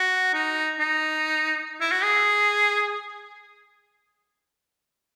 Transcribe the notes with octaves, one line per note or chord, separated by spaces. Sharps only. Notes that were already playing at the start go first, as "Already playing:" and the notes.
Already playing: F#4
D#4
D#4
E4
F#4
G#4